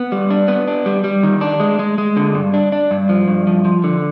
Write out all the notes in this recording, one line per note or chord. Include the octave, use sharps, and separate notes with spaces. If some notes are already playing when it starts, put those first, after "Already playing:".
Already playing: B3
G3
D4
B3
D4
G3
G3
D#3
D4
G#3
G#3
G#3
D3
G2
D4
D4
G2
F3
G2
F3
F3
D3